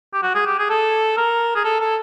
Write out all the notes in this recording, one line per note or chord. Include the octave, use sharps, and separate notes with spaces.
G4
F#4
G#4
G4
G#4
A4
A#4
G#4
A4
A4